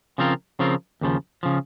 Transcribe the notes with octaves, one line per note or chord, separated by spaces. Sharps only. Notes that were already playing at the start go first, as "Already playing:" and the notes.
C#3 F3 C4 F4 A#4
C#3 F3 C4 F4 A#4
D#2 C#3 F3
C#3 F3